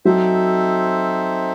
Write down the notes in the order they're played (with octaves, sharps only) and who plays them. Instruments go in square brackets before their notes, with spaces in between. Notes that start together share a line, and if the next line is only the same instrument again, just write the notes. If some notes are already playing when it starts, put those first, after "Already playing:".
[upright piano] F#3 [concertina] C4 D#4 A4 C5 E5